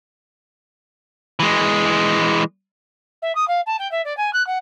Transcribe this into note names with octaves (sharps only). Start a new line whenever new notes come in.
E3 G#3
E5
D#6
F5
A5
G5
E5
D5
G#5
F#6
F#5